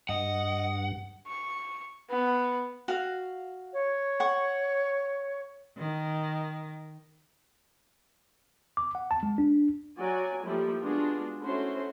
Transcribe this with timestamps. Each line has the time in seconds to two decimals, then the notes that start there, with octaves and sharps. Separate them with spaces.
0.09 G2 D#5 F#5
1.27 C#6
2.10 B3
2.88 F#4 F5
3.73 C#5
4.20 F#5 C#6
5.78 D#3
8.77 D6
8.95 F#5
9.11 A5
9.23 G#3
9.38 D4
9.98 F#3 F#4 D5 G#5
10.44 F3 G3 A3 A#3 E4
10.83 G#3 B3 D4 F4 F#4 G#4
11.41 A3 C#4 E4 F#4 C5 C6